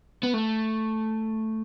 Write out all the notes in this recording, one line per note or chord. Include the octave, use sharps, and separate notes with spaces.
B3
A3